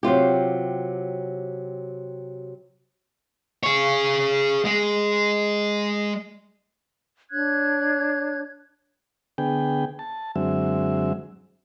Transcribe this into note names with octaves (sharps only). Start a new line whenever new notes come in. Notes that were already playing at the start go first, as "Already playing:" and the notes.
C3 F#3 F4 G4
G#4 C#5
G#3
D4 C#5 F#6 G#6
D3 B3 G#4 G5
A5
F#2 D3 F#3 G#3 C4 E5